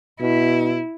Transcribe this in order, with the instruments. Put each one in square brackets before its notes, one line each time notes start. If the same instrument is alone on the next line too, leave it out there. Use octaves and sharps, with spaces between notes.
[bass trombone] B2 [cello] E4